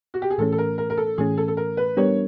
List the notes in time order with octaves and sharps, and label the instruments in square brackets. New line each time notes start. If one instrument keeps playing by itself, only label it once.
[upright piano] F#4
G4
G#4
[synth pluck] A2 E3 A3 C#4 [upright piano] A4
[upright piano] A4
A#4
A#4
A#4
A4
[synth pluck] A2 E3 A3 C#4 [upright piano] G#4
[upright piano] A4
A4
A#4
B4
[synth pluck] G3 B3 D4 G4 A#4 [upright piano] C#5